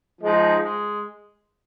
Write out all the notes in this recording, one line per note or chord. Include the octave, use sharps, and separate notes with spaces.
F3 G#3 D#4
G#3